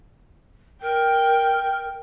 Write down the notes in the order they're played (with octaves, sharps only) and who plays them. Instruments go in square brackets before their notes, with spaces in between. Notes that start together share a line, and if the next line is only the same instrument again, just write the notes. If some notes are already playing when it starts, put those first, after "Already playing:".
[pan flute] A#4 [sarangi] G5